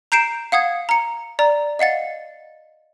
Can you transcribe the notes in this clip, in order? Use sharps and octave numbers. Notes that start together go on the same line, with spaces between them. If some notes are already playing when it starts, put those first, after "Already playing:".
A#5 G6 C7 D7 E7
F5 F#5 D#6 G#6
A#5 C#7
D5 A#5
D#5 F5 F#5 A6